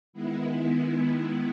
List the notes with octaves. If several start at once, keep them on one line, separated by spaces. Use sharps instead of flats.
D#3 G#3 B3 E4